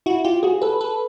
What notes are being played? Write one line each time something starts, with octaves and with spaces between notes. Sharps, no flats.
E4 F#4
F4 G4
F#4 G#4
A4 B4
A4 B4